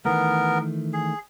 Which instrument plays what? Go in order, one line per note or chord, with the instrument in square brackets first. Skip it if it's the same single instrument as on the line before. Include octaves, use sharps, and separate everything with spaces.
[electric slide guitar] D#3 E3 A3 [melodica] B3 A#4
[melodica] G#4